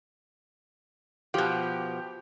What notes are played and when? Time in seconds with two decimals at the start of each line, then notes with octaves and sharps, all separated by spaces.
1.34 B2 F3 G4